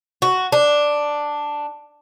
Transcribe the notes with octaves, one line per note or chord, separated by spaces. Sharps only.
F#4
D4